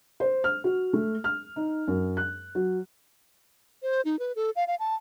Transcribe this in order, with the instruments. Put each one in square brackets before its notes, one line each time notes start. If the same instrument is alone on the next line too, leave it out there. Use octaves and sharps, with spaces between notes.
[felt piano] C5
F6
F#4
A3
F6
D#4
F#2
F#6
F#3
[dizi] C5
D#4
B4
A4
F5
F5
A5